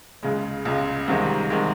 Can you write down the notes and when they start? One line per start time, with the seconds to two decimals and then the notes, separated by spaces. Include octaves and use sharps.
0.23 C#2 C#3 G#3
0.65 C#2 C#3 G#3
1.08 C2 C3 D#3 G#3
1.50 C3 D#3 G#3